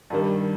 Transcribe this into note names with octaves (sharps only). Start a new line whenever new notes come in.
G2 D#3 G3